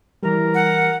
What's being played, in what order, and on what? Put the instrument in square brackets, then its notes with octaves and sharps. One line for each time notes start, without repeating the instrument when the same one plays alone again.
[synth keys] E3 G3 [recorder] A#4
[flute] F#5